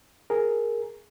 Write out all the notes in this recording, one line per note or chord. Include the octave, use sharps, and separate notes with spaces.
G#4 A#4